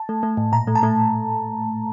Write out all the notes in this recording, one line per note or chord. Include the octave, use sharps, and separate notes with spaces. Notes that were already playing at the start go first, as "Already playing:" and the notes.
Already playing: A5
A3
A3
A2
A#2 A#5
A3
A5
A3